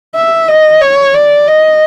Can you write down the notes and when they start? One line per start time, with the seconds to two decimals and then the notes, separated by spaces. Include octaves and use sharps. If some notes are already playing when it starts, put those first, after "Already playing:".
0.15 E5
0.49 D#5
0.81 C#5
1.14 D5
1.47 D#5